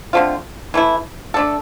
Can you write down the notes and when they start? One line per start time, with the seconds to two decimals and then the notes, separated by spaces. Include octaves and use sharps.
0.13 D3 A3 C4 F4
0.74 E3 A3 E4
1.34 A3 D4 A4